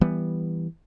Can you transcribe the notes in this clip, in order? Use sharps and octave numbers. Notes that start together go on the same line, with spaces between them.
E3 G3 B3